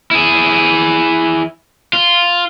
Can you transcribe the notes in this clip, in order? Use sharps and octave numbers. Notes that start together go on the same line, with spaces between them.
E4 G#4
F4